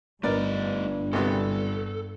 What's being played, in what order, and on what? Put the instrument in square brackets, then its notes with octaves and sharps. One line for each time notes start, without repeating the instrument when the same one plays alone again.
[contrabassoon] G1 [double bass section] G2 [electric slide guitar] A3 D#4 D#5 [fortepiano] A#4 B4 D5
[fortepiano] G#1 C3 B3 [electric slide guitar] A4